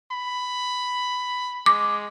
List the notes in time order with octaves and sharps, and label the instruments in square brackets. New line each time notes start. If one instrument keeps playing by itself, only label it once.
[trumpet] B5
[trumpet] G#3 [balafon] D6